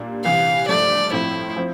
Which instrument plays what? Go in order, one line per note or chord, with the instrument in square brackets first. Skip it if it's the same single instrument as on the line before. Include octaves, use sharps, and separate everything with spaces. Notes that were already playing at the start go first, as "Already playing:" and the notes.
Already playing: [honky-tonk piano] A#2 G3 A#3 D4
[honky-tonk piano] C3 E3 G3 [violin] F5
[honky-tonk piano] G2 F3 A3 [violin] D5
[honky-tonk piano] A2 F3 C4 [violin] E4
[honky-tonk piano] F3 C4